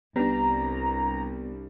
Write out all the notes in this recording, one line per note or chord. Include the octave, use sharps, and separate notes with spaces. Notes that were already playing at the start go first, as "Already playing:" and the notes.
C2 G3 B3 D4 A#5